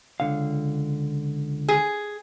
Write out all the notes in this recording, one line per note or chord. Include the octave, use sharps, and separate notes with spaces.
C#2 D3 F5
G#4